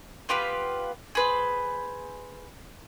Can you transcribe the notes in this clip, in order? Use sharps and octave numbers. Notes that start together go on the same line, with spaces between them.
B3 F4 G4 B4
G#4 B4 C5